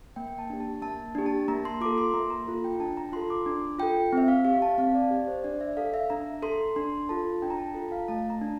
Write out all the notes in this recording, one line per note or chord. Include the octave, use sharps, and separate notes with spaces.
A#3 G5
A5
D4 G4
A5
A#3 A5
D4 G4
A5
A#3 A#5
C6
F4 A4 D6
C6
A#3 A#5
A#5
F4 A4
G5
D4 A5
A#5
F4 A4 C6
D6
D4
F4 A4 G5
C4 E5
F5
G4 F5
A5
C4 F5
D5
G4
C5
D4 D5
E5
A4 F5
E5
D4 A#5
A4 C6
D4 C6
F4 A4 A5
D4 G5
A#5
A5
F4 A4
F5
A3 A5
A#5
D4